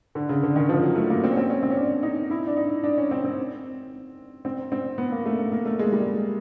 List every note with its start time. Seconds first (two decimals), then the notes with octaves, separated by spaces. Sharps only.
0.15 D3
0.29 C#3
0.43 D3
0.56 D#3
0.69 F3
0.83 F#3
0.96 A3
1.10 A#3
1.24 C4
1.32 C#4
1.37 C4
1.50 C#4
1.63 C4
1.70 C#4
1.77 D4
2.03 D#4
2.31 E4
2.47 D4
2.56 D#4
2.84 D4
2.98 C#4
3.11 C4
3.24 C4
4.45 C4
4.72 C4
4.98 B3
5.12 A#3
5.26 A3
5.38 A#3
5.52 A#3
5.66 A3
5.79 G#3
5.92 G3